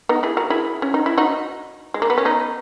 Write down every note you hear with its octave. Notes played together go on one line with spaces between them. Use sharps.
B3 D#4
E4 G#4
F#4 A#4
E4 G#4
C#4
D#4
E4
D#4 F#4
G#3
A#3
B3
C#4
B3 D#4